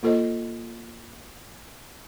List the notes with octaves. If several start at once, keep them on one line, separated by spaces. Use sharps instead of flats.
A#3 F4 A4 C5 D#5